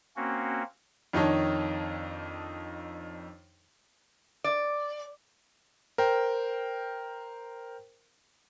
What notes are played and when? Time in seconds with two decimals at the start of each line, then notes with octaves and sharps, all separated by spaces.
0.16 A#3 C4 C#4 F#4
1.13 F2 D#3 D4 D#4 C#5
4.44 D5
5.98 A#4 C5 G5